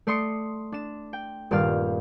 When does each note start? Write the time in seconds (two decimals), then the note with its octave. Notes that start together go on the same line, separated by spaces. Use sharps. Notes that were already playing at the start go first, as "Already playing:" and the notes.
0.07 A3 D5 C6 D#6 C#7
0.72 D4 E7
1.13 G5
1.51 D#1 G2 D5 F5 F6